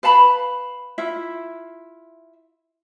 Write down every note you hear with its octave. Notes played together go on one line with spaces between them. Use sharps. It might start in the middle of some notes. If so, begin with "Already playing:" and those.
B4 F5 A5 B5
E4 F4 E5